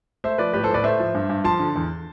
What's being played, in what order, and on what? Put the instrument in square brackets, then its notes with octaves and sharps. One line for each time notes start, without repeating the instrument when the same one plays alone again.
[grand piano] A3 C5 E5
F3 B4 D5
A2 G4 B4
A4 C5
A2 B4 D5
A3 C5 E5
F3
G2
G2
F3 A5 C6
D3
E2